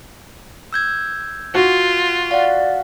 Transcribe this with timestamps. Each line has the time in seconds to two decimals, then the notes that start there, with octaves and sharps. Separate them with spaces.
0.73 E6 G6 G#6
1.55 F4 F#4
2.31 D5 F5 F#5